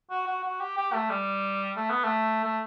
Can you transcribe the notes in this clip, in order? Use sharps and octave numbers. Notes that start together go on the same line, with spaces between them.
F#4
F#4
F#4
G4
G4
A3
G3
A3
B3
A3
A3